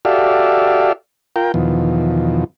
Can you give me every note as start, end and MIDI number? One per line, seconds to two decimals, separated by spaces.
0.05 0.92 66
0.05 0.92 67
0.05 0.92 69
0.05 0.92 74
0.05 0.92 76
0.05 0.92 77
1.36 1.52 65
1.36 1.52 70
1.36 1.52 79
1.54 2.44 40
1.54 2.44 47
1.54 2.44 51
1.54 2.44 53